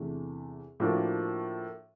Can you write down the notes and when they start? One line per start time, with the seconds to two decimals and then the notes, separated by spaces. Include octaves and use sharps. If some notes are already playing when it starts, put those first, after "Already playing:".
Already playing: E2 C3 E3 A3 D4
0.80 A2 F3 A#3 D4 F#4